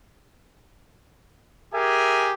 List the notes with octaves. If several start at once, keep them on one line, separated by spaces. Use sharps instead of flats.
G4 G#4 A#4 E5 G#5